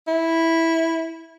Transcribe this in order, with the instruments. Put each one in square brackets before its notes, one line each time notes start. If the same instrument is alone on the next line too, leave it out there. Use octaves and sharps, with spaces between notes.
[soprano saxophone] E4